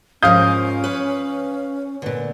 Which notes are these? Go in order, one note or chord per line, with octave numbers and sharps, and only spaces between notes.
G#2 F3 C#4 A#4 F5 D#6 G6
B4 C#5
A#2 D3 B4